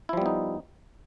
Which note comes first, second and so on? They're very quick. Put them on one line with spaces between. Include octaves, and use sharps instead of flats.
E4 F3 G3 B3 D#4